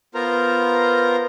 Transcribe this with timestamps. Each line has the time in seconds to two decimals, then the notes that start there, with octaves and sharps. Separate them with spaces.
0.15 B3 F4 A#4 C5 A#5